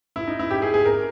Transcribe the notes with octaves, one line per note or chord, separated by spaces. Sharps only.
E4
D#4
E4
G4
G#4
G#4
A#4